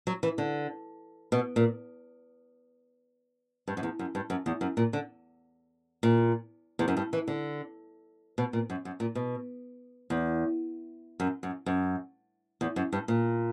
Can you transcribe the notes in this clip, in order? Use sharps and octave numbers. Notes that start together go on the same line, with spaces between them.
F#3
E3
D3
B2
A#2
G2
F#2
E2
F#2
G2
F#2
E2
F#2
A#2
D3
A#2
E2
F#2
G2
E3
D3
B2
A#2
F#2
F#2
A#2
B2
E2
F#2
F#2
F#2
E2
F#2
G2
A#2